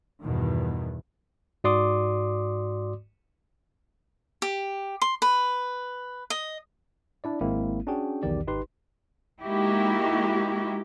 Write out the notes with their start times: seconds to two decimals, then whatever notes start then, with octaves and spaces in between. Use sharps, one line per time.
0.23 E2 G2 B2 D#3
1.64 G#2 F#4 D5 C6 D6 D#6
4.42 G4
5.02 C6
5.22 B4
6.30 D#5
7.24 D4 E4 D5
7.41 G#1 G#3 A#3 C4 E4
7.87 C#4 D4 F#4 G#4 G5
8.23 B1 E2 D#3 G4 D5
8.47 G#1 D#4 G4 B4 C6
9.43 G#3 A#3 D#4 E4 F#4 G4